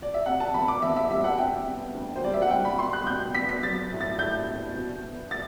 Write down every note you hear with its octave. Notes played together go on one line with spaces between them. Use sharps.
D5
E5
C3 F#5
A5
E2 B5
D6
E2 E5
E5
G3 E5
F#5
C3 G5
B3
D2
C5
G3 D5
E5
F#5
G3 G5
B5
B2 C6
F#6
B2 G6
B3 B6
B6
F#3 A6
A2
A6
A2 G6
B3
B2
B3
A6